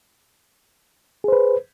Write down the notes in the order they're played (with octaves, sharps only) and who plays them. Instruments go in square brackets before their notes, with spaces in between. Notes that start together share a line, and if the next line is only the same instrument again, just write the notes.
[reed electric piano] G#4
C5
B4